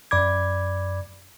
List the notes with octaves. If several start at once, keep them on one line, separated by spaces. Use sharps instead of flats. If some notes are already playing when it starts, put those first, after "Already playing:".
F#2 D5 B5 D6 G#6